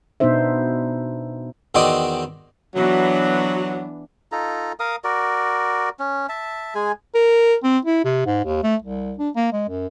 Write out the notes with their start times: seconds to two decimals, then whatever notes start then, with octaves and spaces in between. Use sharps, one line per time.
0.20 B2 B3 D4 D#4 C5 E5
1.75 E2 D#3 C4 F#4 D5 D#5
2.75 E3 F#3 B3 D4
4.32 D#4 F4 A4 A#5
4.80 A#4 F5 D#6
5.04 F#4 A#4 D5
5.99 C#4
6.29 E5 A5
6.75 G#3 G#4 G#5
7.15 A#4
7.64 C4
7.85 E4
8.05 C3
8.26 G#2
8.45 D#2
8.63 A3
8.82 C2
9.19 D4
9.36 A#3
9.52 G#3
9.69 F#2